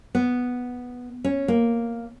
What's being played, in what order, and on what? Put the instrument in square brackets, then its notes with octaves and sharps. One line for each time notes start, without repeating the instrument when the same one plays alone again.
[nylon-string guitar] B3
C#4
A#3